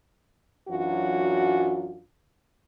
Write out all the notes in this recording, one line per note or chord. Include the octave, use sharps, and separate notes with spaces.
F#2 E3 F#3 D4 F4 F#4